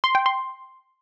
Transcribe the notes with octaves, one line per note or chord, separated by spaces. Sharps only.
C6
G5
C6